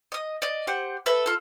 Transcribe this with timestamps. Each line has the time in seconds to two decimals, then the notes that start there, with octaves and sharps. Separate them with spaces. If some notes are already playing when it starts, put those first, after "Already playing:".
0.12 D#5 D#6
0.42 D5 D#5
0.67 G4 C5 F#5
1.06 A4 B4 E5
1.26 F4 A4